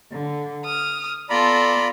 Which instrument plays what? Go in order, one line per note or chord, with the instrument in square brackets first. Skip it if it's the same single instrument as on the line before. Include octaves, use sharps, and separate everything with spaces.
[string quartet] D3
D#6 F6
[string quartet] B3 F4 A4 [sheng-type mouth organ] D5 A#5 B5